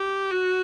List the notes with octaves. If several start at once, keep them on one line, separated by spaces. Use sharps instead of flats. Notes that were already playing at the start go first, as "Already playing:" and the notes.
Already playing: G4
F#4